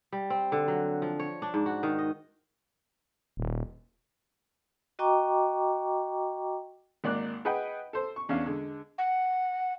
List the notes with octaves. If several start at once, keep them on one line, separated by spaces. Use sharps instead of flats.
G3
C4
D3
F#3
F3
C#5
D4
G#2
F#4
D#3
D#5
D#1
F#4 D#5 G5 A#5 C#6 D6
G#1 A#3 D5 F#6
G#4 B4 D#5 F#5 G5
A4 C5
C#6
E2 C#4 D4 F5
D3 G#3
F#5